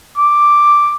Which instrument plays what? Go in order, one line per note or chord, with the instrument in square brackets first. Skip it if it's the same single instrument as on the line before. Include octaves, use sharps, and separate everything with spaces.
[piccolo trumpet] D6